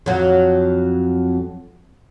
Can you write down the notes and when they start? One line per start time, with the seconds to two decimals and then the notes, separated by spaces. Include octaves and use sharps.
0.06 F2 F#3